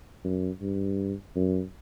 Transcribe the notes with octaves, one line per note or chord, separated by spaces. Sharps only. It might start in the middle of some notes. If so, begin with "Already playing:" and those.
F#2
G2
F#2